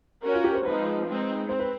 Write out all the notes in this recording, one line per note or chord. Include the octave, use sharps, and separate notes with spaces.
C#4 F#4 A#4 C#5
F4
G4
C5
F3 G#3 C4 D#4 B4
G#3 C4 D#4
C4 C5
B4